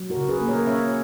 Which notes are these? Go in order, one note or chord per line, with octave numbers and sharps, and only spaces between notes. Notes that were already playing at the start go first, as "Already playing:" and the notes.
Already playing: F#3
F#4 A#4
C#3
G#4 B4
A#3
A#4 C#5
C#4 C#5 E5